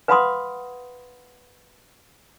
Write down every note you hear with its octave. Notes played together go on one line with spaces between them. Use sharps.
B4 F5 F#5 B5 C6 D#6